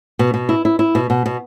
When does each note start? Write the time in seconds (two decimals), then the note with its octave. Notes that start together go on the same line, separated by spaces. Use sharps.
0.19 B2
0.34 B2
0.49 E4
0.65 E4
0.79 E4
0.95 B2
1.10 B2
1.26 B2